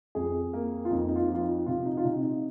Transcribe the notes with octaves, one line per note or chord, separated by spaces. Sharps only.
F2 G#4
A#3
F4
F2 D#4
D#4
F4
F3
F4
D#4
C3 F4
D#4
F4
C3 D#4
D#4